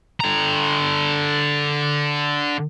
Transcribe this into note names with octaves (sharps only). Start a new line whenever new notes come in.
D3 A#5